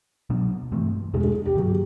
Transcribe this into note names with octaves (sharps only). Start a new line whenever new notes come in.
B2 F#3 B3 D4
G2 E3 A3 C4
E2 B2 G#3 G#4
G#4
G4
G2 D#3 F#3 A#3 F#4